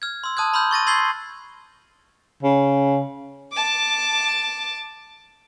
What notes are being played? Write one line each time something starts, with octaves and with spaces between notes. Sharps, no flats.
F6 G#6
C6 E6
A5 D#6 F#6 G#6
B5 C6 E6 F6 G6
C#6 A6 A#6 D#7
C6 E6 G#6 A6 C7 G7
C#3
A5 D6